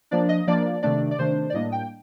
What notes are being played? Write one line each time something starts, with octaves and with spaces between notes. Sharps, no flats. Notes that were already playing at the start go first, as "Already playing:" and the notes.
F3 A#3 D4 D5
D#5
F3 A#3 D4 D5
C3 D#3 A3 D4 D5
D5
C3 D#3 A3 D4 C5
D5
A2 G3 A#3 D4 D#5
G5